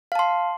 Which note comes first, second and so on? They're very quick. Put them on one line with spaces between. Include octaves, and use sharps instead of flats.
F5 A5 C6